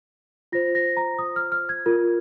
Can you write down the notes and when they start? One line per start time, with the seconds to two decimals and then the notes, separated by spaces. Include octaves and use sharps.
0.52 F4 C5 A#6
0.75 A#6
0.97 A#5
1.19 D#6
1.36 F6
1.52 F6
1.69 G#6
1.86 F4 A#4